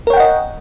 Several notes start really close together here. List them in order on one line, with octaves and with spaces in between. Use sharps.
A#4 C#5 G5 F#5 D#5